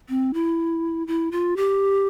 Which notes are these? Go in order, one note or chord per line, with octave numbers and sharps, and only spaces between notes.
C4
E4
E4
F4
G4